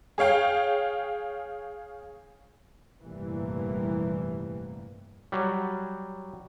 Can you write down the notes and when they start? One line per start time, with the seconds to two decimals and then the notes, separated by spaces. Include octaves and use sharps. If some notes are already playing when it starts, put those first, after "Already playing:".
0.18 G#4 C#5 F5 G5
3.03 F1 A#1 G2 E3 G3 A#3
5.32 F#3 G3